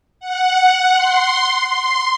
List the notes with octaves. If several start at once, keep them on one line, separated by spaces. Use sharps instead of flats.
F#5
C6
C6